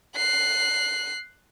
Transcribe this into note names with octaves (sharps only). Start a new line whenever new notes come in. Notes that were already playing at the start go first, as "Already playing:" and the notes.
F#6 C7